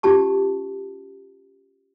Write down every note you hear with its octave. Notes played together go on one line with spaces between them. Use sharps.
C#4 F4 G4 A5 C#6